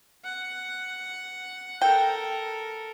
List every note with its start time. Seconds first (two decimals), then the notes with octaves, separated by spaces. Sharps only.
0.24 F#5
1.82 A4 A#4 G5